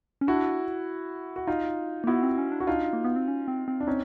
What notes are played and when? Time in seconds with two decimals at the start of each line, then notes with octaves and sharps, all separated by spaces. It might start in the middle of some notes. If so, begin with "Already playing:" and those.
0.21 C#4
0.27 D4 E4 F#4
1.36 F#4
1.47 D#4 F4
2.04 A#3
2.07 B3 E4 F#4
2.23 C4
2.38 C#4
2.52 D4
2.60 F#4
2.67 D4 D#4 F4
2.93 A#3
3.04 B3
3.16 C4
3.28 C#4
3.48 C4
3.68 C4
3.81 D4
3.87 C4 C#4 D#4